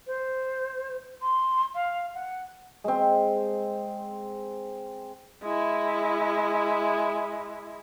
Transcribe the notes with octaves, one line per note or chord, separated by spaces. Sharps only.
C5
C6
F5
F#5
G#3 C4
G#3 E4